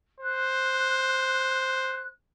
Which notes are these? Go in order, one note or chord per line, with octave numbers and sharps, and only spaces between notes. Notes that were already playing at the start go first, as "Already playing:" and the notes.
C5 F#6